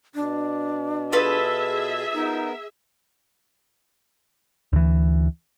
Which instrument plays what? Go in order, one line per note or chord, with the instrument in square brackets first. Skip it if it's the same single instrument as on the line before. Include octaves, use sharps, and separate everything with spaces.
[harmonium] B2 [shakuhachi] D4
[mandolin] F4 A4 B4 [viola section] G#4 E5
[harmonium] B3 A#4 [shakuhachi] D#4
[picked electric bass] D2 E3